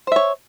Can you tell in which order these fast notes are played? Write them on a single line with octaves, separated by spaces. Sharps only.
C5 E5 C#5